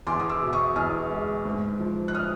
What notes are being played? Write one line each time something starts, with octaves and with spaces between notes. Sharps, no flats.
E2 C6 D6
D#6
D6 E6
B2
C#6 D#6
E2 D#6 F6
G#3
G#2
F3
F#6
D#6 F6